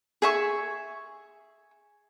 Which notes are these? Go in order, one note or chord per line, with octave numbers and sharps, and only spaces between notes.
G#4 E5 C#6